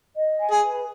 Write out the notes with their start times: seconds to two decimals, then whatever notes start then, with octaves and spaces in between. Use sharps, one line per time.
0.16 D#5
0.40 G#5
0.51 G#4
0.63 B4